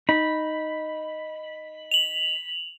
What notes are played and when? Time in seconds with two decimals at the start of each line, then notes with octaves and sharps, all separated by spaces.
0.09 D#4 B5
1.91 F7 F#7